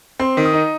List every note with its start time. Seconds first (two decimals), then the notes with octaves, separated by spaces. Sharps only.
0.20 C4 C6
0.37 D#3
0.45 D#6
0.53 D#4